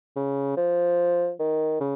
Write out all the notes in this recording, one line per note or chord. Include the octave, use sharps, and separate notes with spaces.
C#3
F3
D#3
C#3